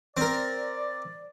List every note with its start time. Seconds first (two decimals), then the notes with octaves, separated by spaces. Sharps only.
0.17 C4 A#4 D5